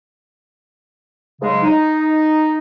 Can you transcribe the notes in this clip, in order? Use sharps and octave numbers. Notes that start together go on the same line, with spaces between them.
G#2 C#3 F#3 G#3
D#4